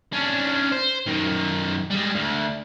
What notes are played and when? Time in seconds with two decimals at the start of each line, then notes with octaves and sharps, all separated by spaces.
0.13 C#4 D4
0.72 C5
1.07 F#2 D#3
1.90 G3 G#3
2.15 D2